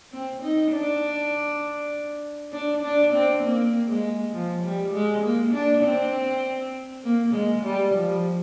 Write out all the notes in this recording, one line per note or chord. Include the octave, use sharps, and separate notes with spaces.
C4
D#4
D4
D4
D4
C4
A#3
G#3
F3
G3
G#3
A#3
D4
C4
A#3
G#3
G3
F3